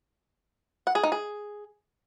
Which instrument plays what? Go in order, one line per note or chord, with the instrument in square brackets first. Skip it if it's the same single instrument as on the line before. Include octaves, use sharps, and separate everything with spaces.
[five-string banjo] F#5
G#4
D#4
G#4